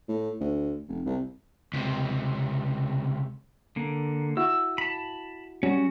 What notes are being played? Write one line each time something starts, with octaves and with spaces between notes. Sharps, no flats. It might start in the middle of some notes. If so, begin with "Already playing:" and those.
A2
D2
F1
C2
C#2 C3
D3 A#3
E4 F#4 E6
A5 B5
F#3 G3 C#4 F#4